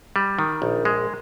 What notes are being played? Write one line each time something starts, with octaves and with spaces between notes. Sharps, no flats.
G3
D#3
A#1
G#3